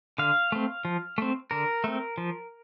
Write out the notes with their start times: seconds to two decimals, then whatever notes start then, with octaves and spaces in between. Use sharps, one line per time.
0.18 D3 F5
0.52 A3 C4
0.85 F3
1.18 A3 C4
1.51 D3 A#4
1.84 A3 C4
2.18 F3